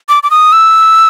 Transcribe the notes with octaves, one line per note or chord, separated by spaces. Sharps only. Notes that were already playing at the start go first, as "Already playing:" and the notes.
D6
D6
D#6
E6